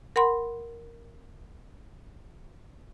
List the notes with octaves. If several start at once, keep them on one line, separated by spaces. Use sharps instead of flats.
A#4 F#5 B5 C6